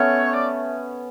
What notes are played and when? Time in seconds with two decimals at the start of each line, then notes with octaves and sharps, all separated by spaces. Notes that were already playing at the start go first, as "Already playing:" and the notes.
Already playing: A3 B3 C#4 C#5
0.34 D5